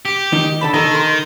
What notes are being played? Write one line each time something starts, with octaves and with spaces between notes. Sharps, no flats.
G4
D#3 D#4
D3 A5 B5
D#3 D#4 A4
C6